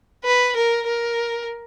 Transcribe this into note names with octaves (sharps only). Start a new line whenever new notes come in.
B4
A#4
A#4